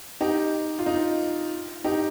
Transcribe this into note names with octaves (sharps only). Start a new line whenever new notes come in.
D#4 G4
F4
D#4
D#4 G4